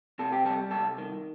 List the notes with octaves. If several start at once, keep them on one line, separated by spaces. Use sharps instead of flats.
C3 A4
G4
G3 A4
C2 A4
D#3